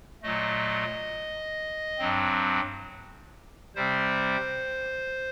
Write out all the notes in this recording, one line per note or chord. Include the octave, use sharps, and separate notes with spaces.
A#2 F#3 A3 D#5
G2 F#3 C4
C3 G3 C4 C5